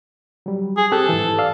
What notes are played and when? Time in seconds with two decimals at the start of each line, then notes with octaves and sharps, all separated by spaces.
0.46 F#3 G3
0.77 G#4
0.92 C4 G4 A4 F#6
1.09 G#2 E3
1.38 D5 F5 E6